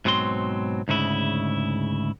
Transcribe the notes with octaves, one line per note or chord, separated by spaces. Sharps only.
G#2 B2 F#3 C4 C6
D2 G#2 C#3 E4